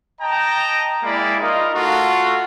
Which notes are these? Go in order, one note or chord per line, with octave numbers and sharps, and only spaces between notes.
D#5 G5 A5 A#5
G#3 A#3 E4 D5 B5
D#4 F4 A#4 D#5 F5
A3 F4 F#4 A4